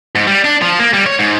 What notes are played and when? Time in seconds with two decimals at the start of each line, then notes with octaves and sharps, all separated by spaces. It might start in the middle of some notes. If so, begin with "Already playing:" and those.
0.15 G#2
0.27 G3
0.44 D4
0.62 F3
0.79 A#3
0.94 G3
1.06 C#5
1.19 G#2